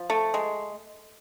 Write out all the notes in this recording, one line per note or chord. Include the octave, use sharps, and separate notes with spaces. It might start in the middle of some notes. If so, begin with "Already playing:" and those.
Already playing: F3
A3
G#3